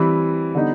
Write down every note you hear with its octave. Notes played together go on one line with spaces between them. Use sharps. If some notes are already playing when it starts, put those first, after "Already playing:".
Already playing: E3 G3 C4 E4
D3 G3 B3 D#4